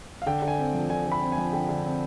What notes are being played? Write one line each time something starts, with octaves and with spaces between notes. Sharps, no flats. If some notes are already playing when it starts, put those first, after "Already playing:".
F5
D3 G5
D3
G#5
C4
F3
D3 G#5
D3
B5
C4
G#5
F3
D3 G5
D3
C4